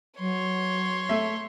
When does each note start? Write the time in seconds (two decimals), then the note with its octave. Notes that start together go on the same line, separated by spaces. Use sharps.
0.19 F#3 C#5 C6
1.09 A3 E5